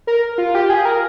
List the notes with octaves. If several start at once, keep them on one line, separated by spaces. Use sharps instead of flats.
A#4
F4
G4
G#4
A#4